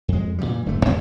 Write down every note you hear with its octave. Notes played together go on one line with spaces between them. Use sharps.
F2 G#3
A#2 C#3 E3 G3
D1 G2 D3 A3
D#2 C#3 G3